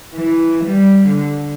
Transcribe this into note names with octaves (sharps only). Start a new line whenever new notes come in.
E3
G3
D3